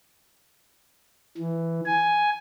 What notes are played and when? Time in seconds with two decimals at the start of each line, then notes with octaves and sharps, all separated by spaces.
1.38 E3
1.86 G#5